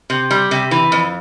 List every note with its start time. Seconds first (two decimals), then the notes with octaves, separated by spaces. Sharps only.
0.10 C3
0.31 G3
0.51 C3
0.71 E3
0.92 F2